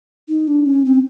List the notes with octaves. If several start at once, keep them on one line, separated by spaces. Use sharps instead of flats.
D#4
D4
C#4
C4